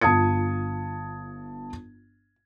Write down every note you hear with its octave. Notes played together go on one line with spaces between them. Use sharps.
G1 F4 A5 D#6 G#6 C#7